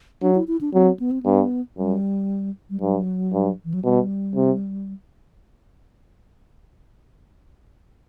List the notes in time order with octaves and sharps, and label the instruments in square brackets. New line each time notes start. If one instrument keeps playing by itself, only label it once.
[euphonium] F#3 [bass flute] D4
[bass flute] E4
E4
D4
[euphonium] F#3 [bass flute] C4
[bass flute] B3
C4
[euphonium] G2 [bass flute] B3
[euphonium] F#2 [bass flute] G3
[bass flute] G3
[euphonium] G2 [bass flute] F#3
[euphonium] G2
[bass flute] E3
F#3
[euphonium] B2 [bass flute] G3
[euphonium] C3